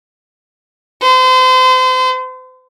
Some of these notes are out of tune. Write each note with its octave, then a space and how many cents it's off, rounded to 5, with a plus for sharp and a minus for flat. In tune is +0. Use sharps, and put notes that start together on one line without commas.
C5 -35